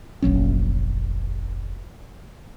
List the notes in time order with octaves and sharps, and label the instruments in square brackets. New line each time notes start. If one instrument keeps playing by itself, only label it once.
[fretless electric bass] F1 A#1 F#3 C#4